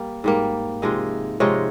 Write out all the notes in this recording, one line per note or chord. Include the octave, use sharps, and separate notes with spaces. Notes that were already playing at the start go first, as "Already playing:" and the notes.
Already playing: G3 A#3
G#2 G3 A#3
C3 F3 G#3 D#4
C3 F3 G#3 D#4 C#5